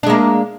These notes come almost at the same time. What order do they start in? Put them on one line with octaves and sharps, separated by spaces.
D4 G#3 A#3